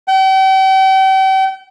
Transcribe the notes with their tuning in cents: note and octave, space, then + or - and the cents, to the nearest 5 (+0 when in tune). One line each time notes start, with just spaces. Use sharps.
G5 -40